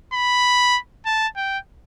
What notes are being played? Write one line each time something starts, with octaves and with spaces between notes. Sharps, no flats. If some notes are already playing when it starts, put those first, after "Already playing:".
B5
A5
G5